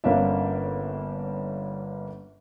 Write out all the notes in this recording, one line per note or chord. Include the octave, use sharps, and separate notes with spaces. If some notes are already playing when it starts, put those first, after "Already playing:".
G1 D3 A#3 C#4 D4 E5